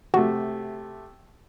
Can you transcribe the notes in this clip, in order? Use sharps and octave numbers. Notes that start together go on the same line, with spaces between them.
C3 A3 F#4